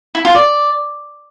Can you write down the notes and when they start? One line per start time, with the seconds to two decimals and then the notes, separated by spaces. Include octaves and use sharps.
0.15 E4
0.25 F4
0.35 D5